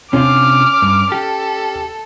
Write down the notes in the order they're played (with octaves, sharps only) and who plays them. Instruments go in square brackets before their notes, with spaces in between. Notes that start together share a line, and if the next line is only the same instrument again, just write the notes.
[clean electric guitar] C3 D4 F4 [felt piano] C#4 [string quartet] D6 F6
[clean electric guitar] G2
[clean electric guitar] G4 [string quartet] A4